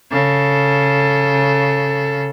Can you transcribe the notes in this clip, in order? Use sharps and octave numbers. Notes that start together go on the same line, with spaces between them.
C#3 A4